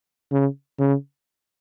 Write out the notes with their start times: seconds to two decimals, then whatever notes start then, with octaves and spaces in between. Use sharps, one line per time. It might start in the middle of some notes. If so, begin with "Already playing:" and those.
0.32 C#3
0.79 C#3